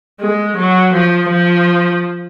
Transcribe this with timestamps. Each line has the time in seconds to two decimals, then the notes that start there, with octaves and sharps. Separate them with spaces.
0.20 G#3
0.56 F#3
0.93 F3
1.30 F3